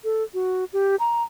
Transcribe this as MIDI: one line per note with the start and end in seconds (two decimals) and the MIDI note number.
0.04 0.23 69
0.34 0.65 66
0.73 0.96 67
1.00 1.23 82